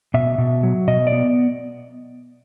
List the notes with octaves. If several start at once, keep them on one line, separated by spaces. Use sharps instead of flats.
B2 E5
B2
F#3
B2 D#5
D5
B3